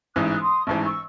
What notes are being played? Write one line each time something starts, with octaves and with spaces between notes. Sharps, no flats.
A1 G#2 E3 D#6 F#6
C6 D#6
A1 G#2 E3 A5 C#6
C#6 E6